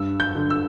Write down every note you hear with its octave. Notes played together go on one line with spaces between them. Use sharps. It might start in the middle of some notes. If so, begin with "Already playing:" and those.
Already playing: G2 E6
G6
D3
E6